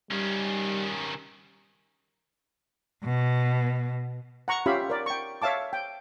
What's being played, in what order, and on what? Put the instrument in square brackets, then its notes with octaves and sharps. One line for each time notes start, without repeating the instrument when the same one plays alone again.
[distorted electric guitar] D#3 C#4 [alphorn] G3
[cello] B2
[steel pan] F#5 A#5 C#6
C#4 F4 G4 E5 F5 B5
A#4 D5
G5 C#6
C#5 E5 F5 A5 D6
G5